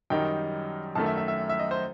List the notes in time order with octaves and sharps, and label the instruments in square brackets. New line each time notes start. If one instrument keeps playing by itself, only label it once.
[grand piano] F#2 D#3 G3 D#4 G5
F#2 D#3 A3 A5
E5
E5
E5
E5
D#5
C5